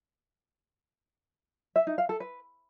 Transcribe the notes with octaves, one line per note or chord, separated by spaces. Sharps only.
E5
D#4
F5
A4
B4